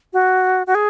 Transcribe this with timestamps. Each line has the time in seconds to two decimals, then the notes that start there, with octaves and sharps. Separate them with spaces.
0.13 F#4
0.67 F#4
0.75 G#4